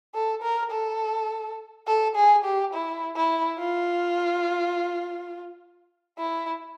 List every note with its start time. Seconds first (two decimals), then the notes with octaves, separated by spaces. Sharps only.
0.15 A4
0.43 A#4
0.71 A4
1.87 A4
2.16 G#4
2.44 G4
2.73 E4
3.16 E4
3.59 F4
6.18 E4